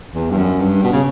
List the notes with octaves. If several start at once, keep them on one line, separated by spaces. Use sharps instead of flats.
E2
G2
F#2
G2
B2
C#3